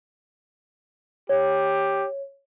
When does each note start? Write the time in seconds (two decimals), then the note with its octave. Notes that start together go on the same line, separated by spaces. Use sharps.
1.29 G4 C#5